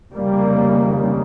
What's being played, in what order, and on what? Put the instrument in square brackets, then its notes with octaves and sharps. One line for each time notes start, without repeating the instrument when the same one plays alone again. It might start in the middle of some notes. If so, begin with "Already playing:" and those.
[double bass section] F1 D#2 C#3 G3 A#3